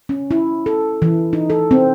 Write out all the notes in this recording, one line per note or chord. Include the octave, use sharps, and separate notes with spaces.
C#4
E4
A4
E3
D#4
A4
C4